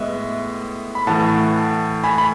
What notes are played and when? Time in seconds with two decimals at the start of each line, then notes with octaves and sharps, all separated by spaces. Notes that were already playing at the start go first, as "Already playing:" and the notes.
Already playing: A2 G#3 B3 D#5 E5
0.95 B5
1.07 A2 E3 A3 F#5 A5
2.04 G#5 B5
2.18 B5